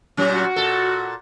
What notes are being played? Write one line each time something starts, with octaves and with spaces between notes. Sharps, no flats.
A#2 F#3 C#4
F#4
A#2 A4